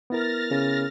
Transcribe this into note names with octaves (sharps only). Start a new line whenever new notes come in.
B3 E4 A#4 F6 A6 A#6
C#3